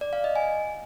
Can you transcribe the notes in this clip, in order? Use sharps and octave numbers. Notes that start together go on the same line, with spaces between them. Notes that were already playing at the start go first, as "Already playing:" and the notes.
D5
F5
D#5
G#5